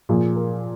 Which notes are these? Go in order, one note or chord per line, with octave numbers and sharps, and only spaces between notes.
A#2 F3 G#4
A#4